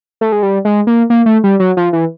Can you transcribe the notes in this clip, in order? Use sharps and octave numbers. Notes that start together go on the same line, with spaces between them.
A3
G#3
G3
G#3
A#3
A#3
A3
G3
F#3
F3
E3